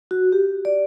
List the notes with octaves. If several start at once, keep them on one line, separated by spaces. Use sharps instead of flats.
F#4
G4
D5